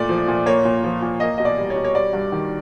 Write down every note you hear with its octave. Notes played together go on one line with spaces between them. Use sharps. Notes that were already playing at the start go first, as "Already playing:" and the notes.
Already playing: A#2 A3 D5
F3
A#2
A#3 C#5
A#2
F3
A#2
A#3 D#5
B2 D#5
D5
G3
C#5
B2
C#5
G3 D5
G2
D#3